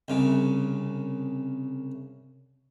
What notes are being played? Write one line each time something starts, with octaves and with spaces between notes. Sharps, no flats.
C2 C#3